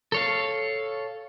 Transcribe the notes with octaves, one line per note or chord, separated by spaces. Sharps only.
A4 C#5 F5